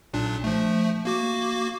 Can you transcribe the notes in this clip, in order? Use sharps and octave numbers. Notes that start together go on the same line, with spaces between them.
B1 A#2 D4
F3 A3
A#3 F#4 D6